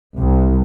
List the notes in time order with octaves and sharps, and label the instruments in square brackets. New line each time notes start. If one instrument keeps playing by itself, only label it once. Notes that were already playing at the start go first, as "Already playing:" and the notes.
[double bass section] C2